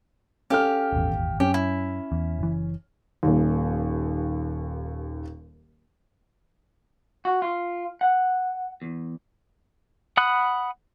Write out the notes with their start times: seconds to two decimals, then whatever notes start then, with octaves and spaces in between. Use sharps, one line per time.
0.50 C#4 G4 A4 F5 F6
0.92 D#1 G#1 E2
1.40 F#2 C#4 G4
1.54 E4
2.12 E2
2.39 F#1 E3
3.23 D#1 D#2
7.25 F#4
7.42 F4
8.01 F#5
8.82 E2
10.17 F#5 B5 D#6 F#6